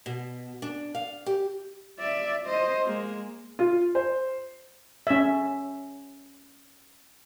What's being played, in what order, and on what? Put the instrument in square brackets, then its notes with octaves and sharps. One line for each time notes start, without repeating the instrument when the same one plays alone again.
[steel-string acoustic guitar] B2
D4
F5
G4
[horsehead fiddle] D5 E5
C5 D#5
G#3 A#3
[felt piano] F4
C5
[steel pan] C#4 E5